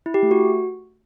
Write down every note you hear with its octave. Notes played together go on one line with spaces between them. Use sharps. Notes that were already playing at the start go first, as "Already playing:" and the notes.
E4
G4
A3
F#4